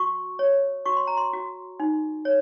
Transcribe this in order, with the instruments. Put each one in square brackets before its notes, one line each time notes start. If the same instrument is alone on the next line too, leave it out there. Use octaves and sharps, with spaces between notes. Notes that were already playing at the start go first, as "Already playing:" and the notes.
Already playing: [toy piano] F#4 C#6
C#5
F#4 C#6
C6
A#5
C6
F#4
D#4
C#5